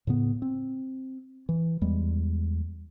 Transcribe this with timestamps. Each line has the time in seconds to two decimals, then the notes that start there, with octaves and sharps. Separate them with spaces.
0.07 A2 C#3 B3
0.42 C4
1.49 E3
1.81 E2 G3 G#3